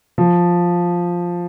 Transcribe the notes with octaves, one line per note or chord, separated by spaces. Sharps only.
F3